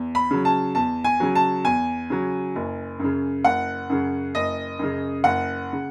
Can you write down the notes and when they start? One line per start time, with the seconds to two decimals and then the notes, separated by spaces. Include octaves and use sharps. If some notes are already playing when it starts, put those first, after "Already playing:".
Already playing: E2
0.15 B5
0.31 C#3 F#3
0.45 A5
0.75 E2 A5
1.04 G#5
1.20 C#3 F#3
1.35 A5
1.64 E2 G#5
2.10 C#3 F#3
2.55 F#1
3.00 F#2 C#3
3.44 F#1 F#5
3.90 F#2 C#3
4.35 F#1 D#5
4.79 F#2 C#3
5.24 F#1 F#5
5.73 C#3